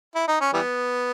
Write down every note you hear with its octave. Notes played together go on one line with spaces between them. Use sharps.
E4
D#4
C#4
E3 G3 B3